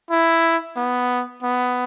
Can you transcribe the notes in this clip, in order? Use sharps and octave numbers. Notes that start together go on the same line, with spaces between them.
E4
B3
B3